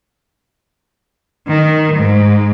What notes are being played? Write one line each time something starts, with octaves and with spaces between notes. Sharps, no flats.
D#3
G#2